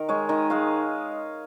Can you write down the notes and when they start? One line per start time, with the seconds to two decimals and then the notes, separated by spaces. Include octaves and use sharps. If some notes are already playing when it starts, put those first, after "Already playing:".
Already playing: D#3 A#4
0.09 G#3 C#5
0.29 D#3 D#5
0.50 G#3 F5